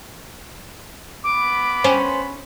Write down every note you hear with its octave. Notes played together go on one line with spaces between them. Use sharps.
B3 B5 D6
C#4 C5